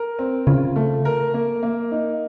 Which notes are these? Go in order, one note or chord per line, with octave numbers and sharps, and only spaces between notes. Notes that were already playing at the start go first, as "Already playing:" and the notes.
Already playing: A#4
C4
C#3 F4
A3
A#4
A#3
A#3
D#4